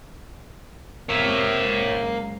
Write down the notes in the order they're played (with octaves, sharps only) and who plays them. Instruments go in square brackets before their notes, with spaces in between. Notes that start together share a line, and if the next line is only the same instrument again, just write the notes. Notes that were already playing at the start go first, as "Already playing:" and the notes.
[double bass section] F2 C3 C4 [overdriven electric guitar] A#3 [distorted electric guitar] C#5 E5
[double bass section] F#1 G#2